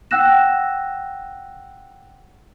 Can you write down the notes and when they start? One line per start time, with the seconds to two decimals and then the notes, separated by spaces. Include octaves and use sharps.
0.11 F#5 G5 E6 F#6 A#6 E7